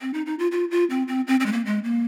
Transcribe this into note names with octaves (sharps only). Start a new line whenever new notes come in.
C4
D#4
D#4
F4
F4
F4
C4
C4
C4
C4
G#3
A#3
G#3
A#3